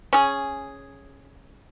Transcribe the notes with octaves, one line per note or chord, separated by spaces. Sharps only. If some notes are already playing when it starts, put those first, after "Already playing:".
C#4 G#4